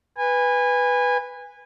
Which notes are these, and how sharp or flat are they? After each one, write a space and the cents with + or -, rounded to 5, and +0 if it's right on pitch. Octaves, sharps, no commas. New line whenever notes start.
B4 +0 G#5 -25